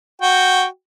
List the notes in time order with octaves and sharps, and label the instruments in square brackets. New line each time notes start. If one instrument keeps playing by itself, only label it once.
[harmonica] F#4 G5